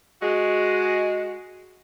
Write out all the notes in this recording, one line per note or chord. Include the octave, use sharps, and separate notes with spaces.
G#3 F#4